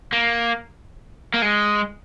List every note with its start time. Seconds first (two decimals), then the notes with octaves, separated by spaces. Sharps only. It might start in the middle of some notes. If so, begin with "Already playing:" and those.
0.13 A#3
1.34 A#3
1.42 G#3